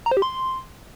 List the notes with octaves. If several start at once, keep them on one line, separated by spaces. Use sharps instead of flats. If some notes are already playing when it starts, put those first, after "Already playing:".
A#5
C5
G4
C6